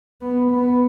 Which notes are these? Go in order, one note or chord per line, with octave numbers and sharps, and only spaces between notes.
B3
B3